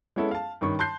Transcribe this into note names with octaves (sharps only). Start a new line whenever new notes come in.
G#3 B3 C#4 E4 A4
F5 A5
G2 D#3 C#4 C#6
A5 C6 F#6 G6 C7